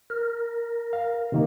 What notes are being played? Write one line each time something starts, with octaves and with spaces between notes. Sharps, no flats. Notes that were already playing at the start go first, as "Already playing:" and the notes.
A#4
F5
C3 D#3 A#3